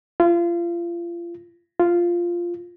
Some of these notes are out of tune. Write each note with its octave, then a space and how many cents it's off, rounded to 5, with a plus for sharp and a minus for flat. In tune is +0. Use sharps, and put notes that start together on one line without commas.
F4 -30
F4 -5